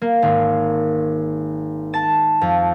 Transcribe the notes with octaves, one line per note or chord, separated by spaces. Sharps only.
A#3
G#1
A5
F2